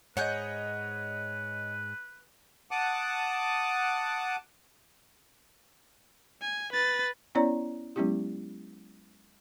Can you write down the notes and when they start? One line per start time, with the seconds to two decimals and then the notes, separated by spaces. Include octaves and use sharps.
0.17 G#2 G#4 B4 C#5 D#5 F#5 F#6 G6
2.71 F#5 A5 D6 D#6
6.42 G#5
6.73 B4 A6
7.35 B3 C#4 E4 C#5 D5 A#5
7.96 F#3 G#3 B3 C#4 E4 G4